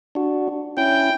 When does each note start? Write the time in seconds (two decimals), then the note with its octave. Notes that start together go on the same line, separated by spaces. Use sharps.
0.15 D4 F#4
0.77 C#4 E4 G5